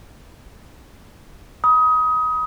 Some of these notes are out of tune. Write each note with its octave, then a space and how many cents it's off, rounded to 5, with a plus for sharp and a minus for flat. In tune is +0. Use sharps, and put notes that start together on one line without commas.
B5 -20 D#6 +20